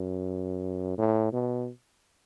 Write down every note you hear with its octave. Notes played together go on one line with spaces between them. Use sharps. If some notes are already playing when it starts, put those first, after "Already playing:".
Already playing: F#2
A2
B2